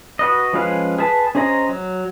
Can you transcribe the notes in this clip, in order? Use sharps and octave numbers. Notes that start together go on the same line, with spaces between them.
F#4 B4 D#5
F3 G#3 C#4 B4 F5
G#4 B4 A5 B5
C#4 G#4 C5 D#5 A#5
F#3